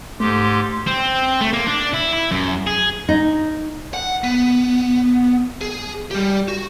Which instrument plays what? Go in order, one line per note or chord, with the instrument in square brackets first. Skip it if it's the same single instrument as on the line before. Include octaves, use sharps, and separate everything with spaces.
[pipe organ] G#2 G4 [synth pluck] A3 [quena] C6
[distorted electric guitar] C4
A3
A#3
D4
E4
E4
F#2
G#4
[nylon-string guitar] D#4
[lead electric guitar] F#5
B3
G#4
G3 G4
F#4